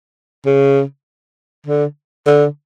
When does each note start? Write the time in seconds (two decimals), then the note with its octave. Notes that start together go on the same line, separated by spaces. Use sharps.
0.46 C#3
1.66 D3
2.27 D3